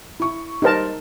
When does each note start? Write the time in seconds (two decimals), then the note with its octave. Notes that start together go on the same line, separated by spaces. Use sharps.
0.20 E4 C#6
0.62 G3 D#4 A#4 C5 A5